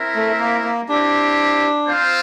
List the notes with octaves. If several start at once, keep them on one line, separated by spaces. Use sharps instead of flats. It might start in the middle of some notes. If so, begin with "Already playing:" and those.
Already playing: C4 E4 A#4 E5
A3
A#3
A#3
C4 D4 E4 G4
C4 F4 C5 F5